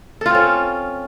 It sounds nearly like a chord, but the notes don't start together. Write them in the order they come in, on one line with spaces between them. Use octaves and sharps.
A4 F4 C4 C#4